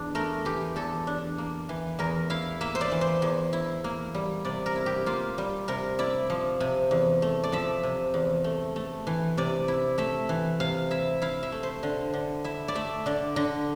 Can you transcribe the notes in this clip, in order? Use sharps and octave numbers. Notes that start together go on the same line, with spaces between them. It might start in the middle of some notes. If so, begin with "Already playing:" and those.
Already playing: E2 D4
A3 A#4
E3 G4
E2 A4
D4
A#3
E3
E2 A#4
E4 F5
A#3 E5
C5
D5
E3
C5
E2
E4
A#3
G3
C3 D5
A#4
E4
G4
A#3 F4
G3
C3 A#4
E4 D5
F3
C3
E2
A3
D5
F3 E5
C3
E2
A3
A3
E3
C3 D5
E4
A3 E5
E3
C3 F5
E4 E5
E4 F5
E5
A3
C5
D3
D3
E4 E5
D5
A3 E5
D3 D5
D3